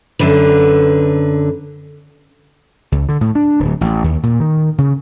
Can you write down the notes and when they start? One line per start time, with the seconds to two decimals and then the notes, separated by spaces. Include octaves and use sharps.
0.19 F#2 D3 B4
2.92 C#2
3.09 D3
3.21 A2
3.35 D4
3.60 D1
3.81 A1
4.04 D#2
4.23 A#2
4.40 D#3
4.78 C#3